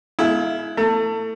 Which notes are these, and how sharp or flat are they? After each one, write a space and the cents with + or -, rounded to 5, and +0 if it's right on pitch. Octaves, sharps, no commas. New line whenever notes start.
G#3 +35 E4 +0 F5 +0
A3 +30 A5 +35